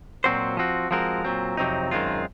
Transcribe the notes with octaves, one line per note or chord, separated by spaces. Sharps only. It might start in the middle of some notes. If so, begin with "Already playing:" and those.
A#2 F#3 C4 F#4 C5
F3 C4 F#4
F3 G#3 C4 F#4 A#4
A#2 F#3 C4
F2 C3 F#3 C4 D#4
F#2 D#3 G#3 C4 F4